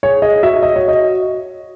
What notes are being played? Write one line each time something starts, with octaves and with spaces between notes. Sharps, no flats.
G#4 C#5
G#4 D#5
F#4 E5
D#5
C#5
D#5